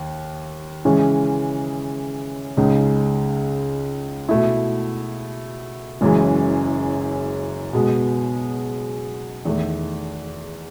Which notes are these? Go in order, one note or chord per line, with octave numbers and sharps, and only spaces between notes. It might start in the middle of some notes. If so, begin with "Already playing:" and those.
Already playing: D#2
C#3 E3 G#3 C#4
C#2 C#3 G#3 D#4
B2 A3 E4
F#1 F#2 E3 G#3
B2 G#3 B3
E2 D#3 A3